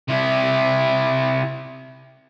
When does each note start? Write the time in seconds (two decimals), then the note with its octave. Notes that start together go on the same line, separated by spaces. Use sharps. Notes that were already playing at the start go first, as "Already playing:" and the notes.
0.09 C3 E4